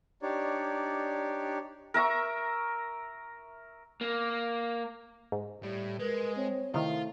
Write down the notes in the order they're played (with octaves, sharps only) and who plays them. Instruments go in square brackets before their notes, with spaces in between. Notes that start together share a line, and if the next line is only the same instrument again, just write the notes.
[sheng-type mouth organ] D4 D#4 G4 C#5 D5
[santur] A#4 E5 A#5 C#6
[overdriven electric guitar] A#3
[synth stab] G#2
[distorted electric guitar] A2 [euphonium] G3
[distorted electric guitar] G#3 [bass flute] A#4 [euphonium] B4
[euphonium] C4 [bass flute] C#5
[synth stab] C3 D#3 [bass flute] A3 [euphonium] E4 [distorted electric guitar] F4